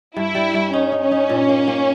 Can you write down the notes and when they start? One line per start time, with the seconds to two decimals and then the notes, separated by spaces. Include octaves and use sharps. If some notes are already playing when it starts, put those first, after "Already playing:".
0.16 G2 E4
0.35 G3
0.54 G2
0.73 C#4 D#4
0.92 D#4
1.02 C#4
1.11 D#4
1.29 A#2
1.49 A#3
1.68 A#3